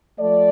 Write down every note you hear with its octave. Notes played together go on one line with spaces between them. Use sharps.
F3 A3 D5